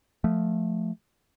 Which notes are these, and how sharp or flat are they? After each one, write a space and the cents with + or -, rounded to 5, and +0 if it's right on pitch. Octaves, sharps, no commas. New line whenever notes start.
F3 +10 A3 -5